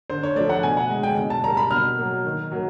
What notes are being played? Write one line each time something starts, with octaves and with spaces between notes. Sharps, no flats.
D3 C5
C#5
F3 A3 D5
F#5
B2 G#5
F#5
G#3
G5
B2
A5
G3 A#3 A#5
B5
B2 F6
F#3 A#3
D#3
F#3 A#3